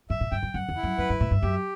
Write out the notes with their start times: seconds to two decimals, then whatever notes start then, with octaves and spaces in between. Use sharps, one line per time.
0.10 G2 E5
0.21 A2
0.32 G2 G5
0.43 F#2
0.54 F#2 F#5
0.69 E2
0.76 E4
0.83 F#2
0.98 F#2 B4
1.10 G2
1.20 A2 E5
1.31 G2
1.42 F#2 G4